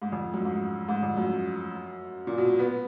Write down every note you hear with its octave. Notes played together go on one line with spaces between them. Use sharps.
G#2
F2
F#2
G#2
G#2
F2
F#2
A#2
B2
B3